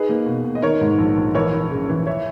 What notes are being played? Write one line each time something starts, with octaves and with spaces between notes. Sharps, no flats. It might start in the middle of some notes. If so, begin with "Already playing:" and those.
Already playing: D#4 G#4 B4
A#3
B2
B2
D#5
D#3 A#4 C#5
G#2
A#1
A#1
E3 A#4 C#5
E3
C#3
E3
C#5 E5